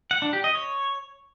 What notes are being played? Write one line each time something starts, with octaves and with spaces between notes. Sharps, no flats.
F#5
D4
G4
D#5
C#5